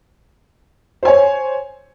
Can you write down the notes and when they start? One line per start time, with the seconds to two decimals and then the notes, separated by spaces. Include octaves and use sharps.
1.03 C5
1.05 G#5
1.08 C#5